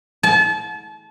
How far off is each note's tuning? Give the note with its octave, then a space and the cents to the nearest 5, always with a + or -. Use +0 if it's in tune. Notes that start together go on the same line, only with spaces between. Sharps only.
A5 -35